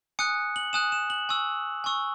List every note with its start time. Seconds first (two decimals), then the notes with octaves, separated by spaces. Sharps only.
0.19 G#5 D#6 F#6 C#7
0.56 F#7
0.73 G#5 D#6 F#6 E7
0.92 E7
1.10 F#7
1.29 G#5 C#6 E6
1.84 G#5 C#6 E6